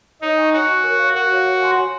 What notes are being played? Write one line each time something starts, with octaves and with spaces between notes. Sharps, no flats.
D#4 C#5
G#5 C#6
F#4 C#5
G#5 C#6
A#4
C#5 F5
F#4 A#4
C#5 F5
C#5
G#5 C6
C#5